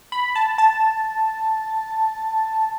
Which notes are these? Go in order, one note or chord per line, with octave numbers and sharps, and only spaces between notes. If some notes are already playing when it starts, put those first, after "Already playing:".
B5
A5
A5